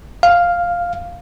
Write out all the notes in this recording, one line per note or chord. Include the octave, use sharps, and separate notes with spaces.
F5